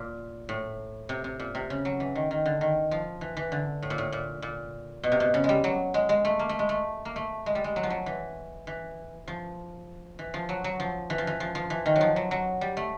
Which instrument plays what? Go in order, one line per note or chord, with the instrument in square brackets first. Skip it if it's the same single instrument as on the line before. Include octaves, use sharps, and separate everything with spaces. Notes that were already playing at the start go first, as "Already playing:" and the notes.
Already playing: [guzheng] A#2
A2
C3
C3
A#2
C3
C#3
F#3
E3
D#3
D#3
D3
D#3
F3
E3
E3
D3
A2
A#2
A2
A#2
A#2
B2
C3
B2
C#3
G#3
G3
F#3
G#3
G#3
A3
A#3
A3
G#3
A3
A#3
A3
G#3
G3
G#3
F#3
F3
F#3
E3
E3
F3
E3
F3
F#3
F#3
F3
E3
F3
E3
F3
F3
E3
D#3
F#3
F3
F#3
F#3
G3
A3